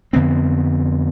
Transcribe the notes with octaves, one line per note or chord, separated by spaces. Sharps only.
F2 D3 B3 C4